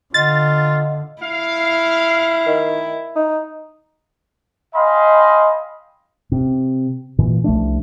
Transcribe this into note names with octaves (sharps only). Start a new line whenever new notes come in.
D3 F4 D#5 F5 F#5 A6
E4 F5
D#3
D#4
D#5 F5 G5 G#5 B5 C6
C3
A#2 E3
C2 F3 A3 D4